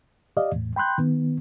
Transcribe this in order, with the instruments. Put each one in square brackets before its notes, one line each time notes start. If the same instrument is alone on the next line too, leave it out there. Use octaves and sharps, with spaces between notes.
[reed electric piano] G4 D5 D#5 F5
E2 A2
G5 B5 C6 F#6 G6
D#3 B3